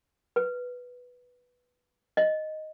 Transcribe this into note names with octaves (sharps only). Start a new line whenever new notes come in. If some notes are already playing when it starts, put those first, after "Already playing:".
B4
D#5